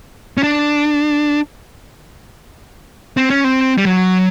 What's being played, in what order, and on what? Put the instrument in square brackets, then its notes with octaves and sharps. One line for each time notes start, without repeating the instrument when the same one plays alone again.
[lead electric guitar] C#4
D4
C4
C#4
C4
G3
F#3